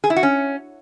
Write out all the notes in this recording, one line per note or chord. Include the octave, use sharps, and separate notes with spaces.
G#4
E4
F#4
C#4